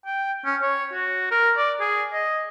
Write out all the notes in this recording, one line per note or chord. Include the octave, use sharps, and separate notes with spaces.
G5
C#4
C#5
F#4
A#4
D5
G#4
D#5